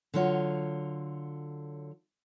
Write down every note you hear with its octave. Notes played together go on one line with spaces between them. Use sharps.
D3 F#3 F4 C#5